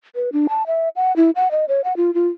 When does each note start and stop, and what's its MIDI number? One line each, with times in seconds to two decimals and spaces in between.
0.15 0.29 71
0.33 0.47 62
0.49 0.66 81
0.67 0.89 76
0.96 1.15 78
1.16 1.31 64
1.36 1.51 78
1.51 1.65 75
1.68 1.81 73
1.84 1.96 78
1.97 2.13 65
2.14 2.28 65